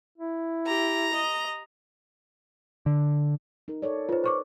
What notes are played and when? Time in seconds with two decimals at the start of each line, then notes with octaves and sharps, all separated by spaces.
0.18 E4
0.67 G4 A#5
1.13 D#5
2.86 D3
3.68 D#4 A#4
3.82 A4 C#5 D5
4.09 F4 B4 C5
4.24 C5 C#6 D6